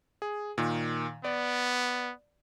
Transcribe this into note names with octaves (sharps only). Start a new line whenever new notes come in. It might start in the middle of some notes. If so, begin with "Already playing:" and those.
G#4
A#2 D#3
B3 D5